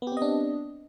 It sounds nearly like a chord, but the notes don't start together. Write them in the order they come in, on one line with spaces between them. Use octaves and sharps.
B3 G4 C4 D#5 D4